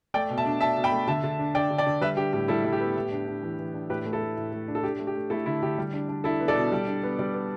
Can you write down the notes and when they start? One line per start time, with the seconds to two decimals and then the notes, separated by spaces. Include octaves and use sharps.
0.14 A3 D5 G5
0.30 B2
0.38 E5 A5
0.46 D4
0.60 D4 E5 A5
0.76 B2
0.84 G5 B5
0.92 A3
1.08 D3 E5 A5
1.23 D3
1.39 D4
1.55 D4 D5 G5
1.70 D3
1.78 D5 G5
1.86 D3
2.01 G3 B4 E5
2.17 D4 G4
2.33 A2 G4
2.48 G3 E4 A4
2.64 G3
2.73 G4
2.80 B3
2.96 A2
3.12 D4
3.27 D4
3.43 E3
3.59 E3
3.74 D4
3.89 A2 G4 B4
4.05 A3
4.13 E4 A4
4.21 A3
4.37 A2
4.52 A3
4.68 D4
4.75 A4
4.83 D4 G4
5.00 A3
5.07 G4
5.15 A3
5.30 A3 E4 A4
5.46 D3 E4
5.62 D3 G4
5.78 G3
5.94 D4
6.09 D4
6.24 D4 E4 A4
6.40 B3
6.48 A4 D5
6.56 B2
6.72 G3
6.87 D4
7.03 B3
7.19 G3
7.34 B3